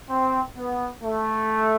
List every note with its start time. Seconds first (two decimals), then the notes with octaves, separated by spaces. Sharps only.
0.10 C4
0.57 B3
1.02 A3